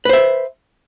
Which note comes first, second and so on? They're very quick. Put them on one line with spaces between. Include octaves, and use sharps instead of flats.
B4 C5 E5